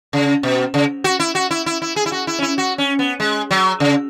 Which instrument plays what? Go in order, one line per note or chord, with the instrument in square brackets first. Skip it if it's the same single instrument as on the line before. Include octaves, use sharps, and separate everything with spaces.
[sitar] C#3
B2
C#3
F#4
E4
F#4
E4
E4
E4
G#4
E4
F#4
E4
C#4
E4
F#4
C#4
B3
G#3
F#3
C#3